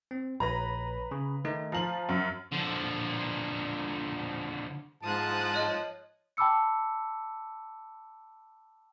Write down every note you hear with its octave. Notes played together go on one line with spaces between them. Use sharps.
C4
A#1 B4 C#5 A#5 A#6
C#3
D#3 A3 D#4
F3 C5 F5 A#5 F#7
F#2
D3 F3
G#2 F3 A5 D#6 F#6
C#5 D#5
G5 A5 B5 D6 E6 C#7